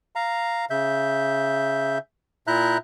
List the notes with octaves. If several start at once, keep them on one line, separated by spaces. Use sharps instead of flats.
F5 A#5
C#3 E5 G6
A#2 E4 E5 A#5 F#6 G6